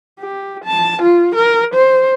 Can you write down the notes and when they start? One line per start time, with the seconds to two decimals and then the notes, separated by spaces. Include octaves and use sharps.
0.19 G4
0.65 A5
1.02 F4
1.35 A#4
1.74 C5